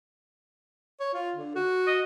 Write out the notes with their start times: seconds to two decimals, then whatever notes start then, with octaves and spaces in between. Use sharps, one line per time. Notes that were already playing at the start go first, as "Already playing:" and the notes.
1.00 C#5
1.14 F4
1.36 D3
1.56 F#4
1.87 D#5